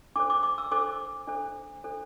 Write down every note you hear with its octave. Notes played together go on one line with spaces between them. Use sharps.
D4 A4 C5 D6
D6
D6
E6
D4 A4 C5 D6
D4 A4 C5
D4 A4 C5